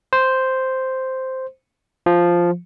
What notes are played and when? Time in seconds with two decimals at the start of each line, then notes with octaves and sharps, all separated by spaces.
0.13 C5
2.06 F3